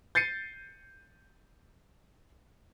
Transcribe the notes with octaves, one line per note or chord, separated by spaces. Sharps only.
G6 A6 C7 C#7 D#7